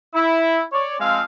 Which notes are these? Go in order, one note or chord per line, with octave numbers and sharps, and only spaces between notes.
E4
C#5 D5
F3 G#3 C4 F5